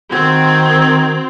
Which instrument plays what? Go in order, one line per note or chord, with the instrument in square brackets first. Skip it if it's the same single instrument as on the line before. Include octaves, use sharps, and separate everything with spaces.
[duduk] D#3 [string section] C4 [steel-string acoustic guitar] F#4 [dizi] G#6